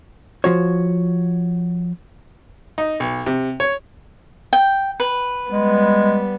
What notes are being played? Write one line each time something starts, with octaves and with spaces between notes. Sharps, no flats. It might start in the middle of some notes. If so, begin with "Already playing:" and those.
F3 F#4 C#5
D#4
B1
C3
C#5
G5
B4
G3 G#3 B3